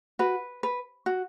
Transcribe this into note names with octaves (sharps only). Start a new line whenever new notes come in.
F#4 B4
B4
F#4